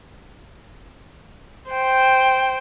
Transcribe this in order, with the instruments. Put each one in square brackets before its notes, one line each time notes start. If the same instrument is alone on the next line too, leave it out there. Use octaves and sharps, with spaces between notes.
[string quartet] C5 G5